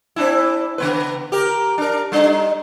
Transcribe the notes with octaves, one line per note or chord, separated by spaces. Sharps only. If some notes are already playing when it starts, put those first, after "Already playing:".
C4 D4 E4
C#3 B3 B4
G4 A#4
D4 A#4
G3 D4 D#4